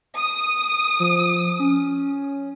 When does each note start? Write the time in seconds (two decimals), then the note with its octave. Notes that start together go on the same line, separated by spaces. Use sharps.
0.17 D#6
1.00 F3
1.59 C#4